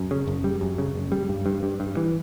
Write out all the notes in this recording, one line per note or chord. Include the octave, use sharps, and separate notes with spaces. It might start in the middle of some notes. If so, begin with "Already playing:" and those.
Already playing: F#2
C#3
F#1
G3
F#2
C#3
F#1
G3
G2
G2
G2
G2
E3